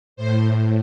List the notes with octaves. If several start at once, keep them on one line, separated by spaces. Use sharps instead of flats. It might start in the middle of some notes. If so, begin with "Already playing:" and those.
A2 C5